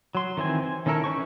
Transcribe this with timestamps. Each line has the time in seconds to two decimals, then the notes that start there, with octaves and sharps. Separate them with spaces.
0.15 F#3 C6
0.37 D#3 E3 C4 G#5
0.63 G#5
0.86 D#3 C#4 E4 A4 A#4
1.04 E3 C#4 C5 C#6